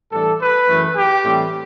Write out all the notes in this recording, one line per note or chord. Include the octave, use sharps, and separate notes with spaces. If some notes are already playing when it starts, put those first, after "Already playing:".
A2 E3 G3 D4 A4
B4
F#2 E3 A3
G4
A2 E3 G3 C4